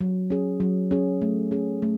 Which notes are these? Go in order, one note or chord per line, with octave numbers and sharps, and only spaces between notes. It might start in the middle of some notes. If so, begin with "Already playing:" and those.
F#3
C#4 G#4
F#3
C#4 G#4
A3
C#4 G#4
A3